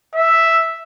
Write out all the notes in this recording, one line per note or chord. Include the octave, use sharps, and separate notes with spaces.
E5